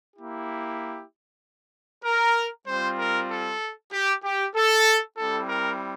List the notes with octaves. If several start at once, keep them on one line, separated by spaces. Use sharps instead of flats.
A#3 E4 G4
A#4
G3 C4 F4 C5
A#4
A4
G4
G4
A4
G3 C4 E4 A4
A#4